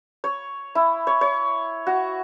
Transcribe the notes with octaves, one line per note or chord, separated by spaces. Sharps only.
C#5
E4
C#5
C#5
F#4